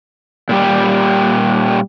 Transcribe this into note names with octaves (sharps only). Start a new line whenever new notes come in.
A#2 G3 G4